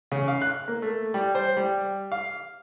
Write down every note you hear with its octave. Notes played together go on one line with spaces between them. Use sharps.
C#3
F5
F#6
A#3
A3
G3
C5
G3
F5